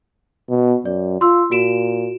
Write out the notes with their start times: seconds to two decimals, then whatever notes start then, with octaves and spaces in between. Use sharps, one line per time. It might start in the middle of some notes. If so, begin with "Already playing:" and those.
0.49 B2
0.86 F#2 D5
1.21 F4 C6 E6
1.51 A#2 F#4 D7 E7